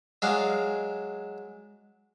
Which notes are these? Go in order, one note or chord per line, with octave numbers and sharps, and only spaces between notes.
F#3 G#3 D4 F5